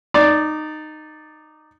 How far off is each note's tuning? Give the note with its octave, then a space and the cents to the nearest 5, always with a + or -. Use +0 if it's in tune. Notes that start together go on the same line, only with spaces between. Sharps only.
D#4 -15 D5 +0